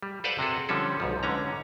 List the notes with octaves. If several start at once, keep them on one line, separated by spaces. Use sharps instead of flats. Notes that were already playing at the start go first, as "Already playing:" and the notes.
G3
A4 B4 C5 D5 F5 F#5
C3 F#4 G#4 A4
D3 F3 G3 C#4 A4
B1 G#2 F3
G#2 D3 C#4 A#5